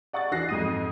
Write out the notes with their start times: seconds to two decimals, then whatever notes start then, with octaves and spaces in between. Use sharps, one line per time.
0.13 D5 F#5 C#6 D#6 A6
0.31 E3 D4 F#4 F#6 A#6 C7
0.49 F2 G#2 D#6 D#7